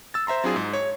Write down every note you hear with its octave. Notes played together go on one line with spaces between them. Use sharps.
E6 A6
C5 E5 A#5 C6
F#3 C4 D4 E4 F4 G#4
G#2
C#5